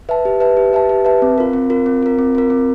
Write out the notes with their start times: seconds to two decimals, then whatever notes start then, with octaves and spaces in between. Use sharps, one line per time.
0.09 B4 E5 A5
0.25 G4
0.40 B4 E5 A5
0.57 G4
0.73 B4 E5 A5
0.89 G4
1.05 B4 E5 A5
1.22 C4
1.38 F4 A#4
1.53 C4
1.70 F4 A#4
1.86 C4
2.03 F4 A#4
2.19 C4
2.35 F4 A#4
2.50 C4